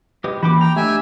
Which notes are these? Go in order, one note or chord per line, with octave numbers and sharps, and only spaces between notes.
G#3 G4 B4 D#5
E3 A#3 F4 F#4 G5 D6
G5 A#5
A3 D4 G4 D#5 E5 F#5 G#5